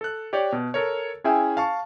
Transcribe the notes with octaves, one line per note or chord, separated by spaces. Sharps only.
A4 F#6
G4 C#5 D5
B2
A4 A#4 C#5
C#4 E4 G#4 E5 G5 G#5
F5 A5 C#6